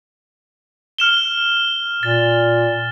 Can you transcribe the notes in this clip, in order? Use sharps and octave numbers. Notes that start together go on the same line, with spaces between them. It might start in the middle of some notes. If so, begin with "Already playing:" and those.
F6 E7 G7
A#2 A6